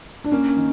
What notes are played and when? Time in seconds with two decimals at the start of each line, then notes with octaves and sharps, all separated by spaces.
0.24 D4
0.31 A#3 C#4
0.56 D#3